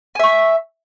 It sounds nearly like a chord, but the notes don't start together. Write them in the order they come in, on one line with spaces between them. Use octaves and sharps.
G#5 E5 C#6